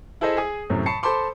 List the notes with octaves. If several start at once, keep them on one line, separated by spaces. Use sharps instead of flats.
E4 G#4 A4 C5 D#5 E5
G#4 G#5 D#6
F#2 A2 C3
A5 B5 C#6 C7 C#7
A4 C5 A5 B5 C6 D6